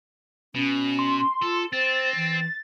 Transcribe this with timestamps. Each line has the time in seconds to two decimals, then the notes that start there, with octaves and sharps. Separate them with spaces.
0.55 B2 C#4
0.99 C6
1.42 F4 A4
1.73 C4 C5 A6
2.16 E3